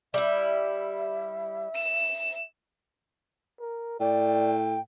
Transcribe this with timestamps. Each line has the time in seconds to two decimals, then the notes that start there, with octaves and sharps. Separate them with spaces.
0.14 G3 E4 E5
1.75 E7
3.60 A#4
4.00 A2 D5 G5